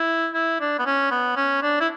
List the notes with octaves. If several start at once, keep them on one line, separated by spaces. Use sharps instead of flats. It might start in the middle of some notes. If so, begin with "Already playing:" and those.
Already playing: E4
E4
D4
B3
C#4
B3
C#4
D4
E4